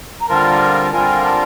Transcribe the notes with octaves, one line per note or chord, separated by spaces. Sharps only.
A#5
D3 G3 C4 F4 A#4 A5
D3 G3 C4 F4 A#4 G#5
A5